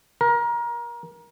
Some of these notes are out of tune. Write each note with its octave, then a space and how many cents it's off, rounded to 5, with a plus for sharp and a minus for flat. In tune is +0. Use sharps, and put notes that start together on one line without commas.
A#4 +25